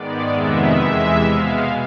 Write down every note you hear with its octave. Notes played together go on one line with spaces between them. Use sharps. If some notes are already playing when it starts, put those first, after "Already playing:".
Already playing: G#2 D#3 G#3 B3 D5
F2 C3 D#3 G#3 B3 E5
E2 C3 E3 G#3
B2 G#3 B3 F5